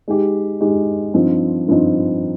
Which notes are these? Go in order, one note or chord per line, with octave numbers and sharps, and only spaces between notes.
G#3 D#4 G4
G#3 D#4 G4
G2 F3 C4 D#4
G2 F3 C4 D#4